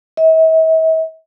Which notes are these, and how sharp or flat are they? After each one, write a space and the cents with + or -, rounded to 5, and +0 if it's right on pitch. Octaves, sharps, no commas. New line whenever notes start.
E5 -45